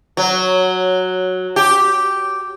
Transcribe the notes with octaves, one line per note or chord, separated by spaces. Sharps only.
F#3
G4